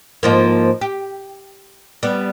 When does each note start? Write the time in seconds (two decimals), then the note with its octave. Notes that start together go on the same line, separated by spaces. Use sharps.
0.23 G#2 F3 A#3
0.81 G4
2.03 G3 B3